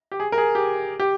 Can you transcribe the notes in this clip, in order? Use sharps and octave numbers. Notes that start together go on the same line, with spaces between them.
G4
G#4
A#4
G#4
G4
G4